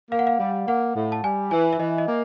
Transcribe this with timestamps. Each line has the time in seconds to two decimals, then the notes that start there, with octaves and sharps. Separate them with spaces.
0.11 A#3 F5
0.19 F#5
0.27 F5
0.39 G3
0.67 A#3 F#5
0.95 A2
1.12 A5
1.23 G3 G#5
1.51 E3 G#5
1.73 E5
1.80 E3 D#5
1.98 D#5
2.07 A#3